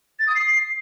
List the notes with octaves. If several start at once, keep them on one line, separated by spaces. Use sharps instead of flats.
A6
D#6
C7